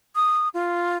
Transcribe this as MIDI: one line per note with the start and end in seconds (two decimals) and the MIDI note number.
0.16 0.48 87
0.54 0.97 65